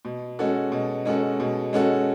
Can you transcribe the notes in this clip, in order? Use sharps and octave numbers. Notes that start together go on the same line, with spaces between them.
B2
G#3 C#4 F#4 A4
B2
G#3 C#4 F#4 A4
B2
G#3 C#4 F#4 A4